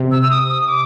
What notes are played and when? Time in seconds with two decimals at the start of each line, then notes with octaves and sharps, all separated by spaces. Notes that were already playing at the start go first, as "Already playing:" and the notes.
Already playing: C3
0.11 E6
0.23 E6
0.31 D#6
0.49 D#6
0.68 D6